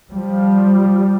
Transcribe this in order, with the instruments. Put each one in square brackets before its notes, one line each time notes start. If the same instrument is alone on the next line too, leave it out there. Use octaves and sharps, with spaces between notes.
[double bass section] F3 G3